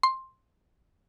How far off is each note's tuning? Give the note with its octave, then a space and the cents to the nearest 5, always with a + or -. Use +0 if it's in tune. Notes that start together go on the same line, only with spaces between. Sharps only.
C6 +10